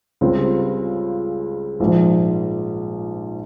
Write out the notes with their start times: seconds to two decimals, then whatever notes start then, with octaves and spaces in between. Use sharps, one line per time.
0.21 C#2 C#3 G3 C4 G4
1.80 A#1 G#2 F3